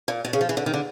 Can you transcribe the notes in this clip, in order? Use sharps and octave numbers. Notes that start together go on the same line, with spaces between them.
A#2
B2
C#3
F3
E3
D3
D#3
D3